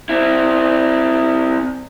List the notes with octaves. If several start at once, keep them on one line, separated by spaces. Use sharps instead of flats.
C4 E4